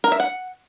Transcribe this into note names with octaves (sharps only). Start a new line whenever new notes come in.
A#4
E5
F#5